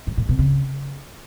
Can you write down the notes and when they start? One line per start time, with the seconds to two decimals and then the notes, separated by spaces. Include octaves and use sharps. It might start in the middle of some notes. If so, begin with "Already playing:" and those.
0.07 G#2
0.17 A#2
0.29 B2
0.39 C#3